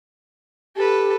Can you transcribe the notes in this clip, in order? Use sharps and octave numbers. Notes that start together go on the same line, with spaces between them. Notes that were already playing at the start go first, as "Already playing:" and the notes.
G4 A4 B4